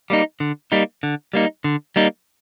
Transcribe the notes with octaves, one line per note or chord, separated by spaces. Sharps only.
G3 A#3 D#4
D3
G3 A#3 D#4
D3
G3 A#3 D#4
D3
G3 A#3 D#4